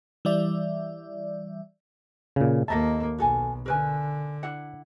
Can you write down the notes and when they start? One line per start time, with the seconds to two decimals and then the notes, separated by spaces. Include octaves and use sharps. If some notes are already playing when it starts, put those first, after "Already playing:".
0.25 E3 G3 D5 E5
2.36 A#2 C#3
2.68 D#2 A#3 A4 D#5 E5 A5 A#5
3.19 B1 F#4 A4 G#5
3.66 D3 A#4 B4 G#5
4.43 D4 E4 F#5